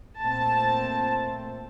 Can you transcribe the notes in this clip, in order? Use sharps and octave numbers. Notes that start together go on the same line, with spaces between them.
A#2 A3 C4 A5